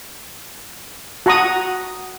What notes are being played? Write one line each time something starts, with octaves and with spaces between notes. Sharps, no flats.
F#4 F#5 A#5 C#6 D#6